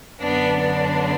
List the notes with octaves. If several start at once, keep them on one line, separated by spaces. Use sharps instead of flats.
F#2 D3 B3 D4
B3 D4